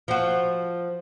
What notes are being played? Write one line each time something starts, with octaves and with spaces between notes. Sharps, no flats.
F3 F#4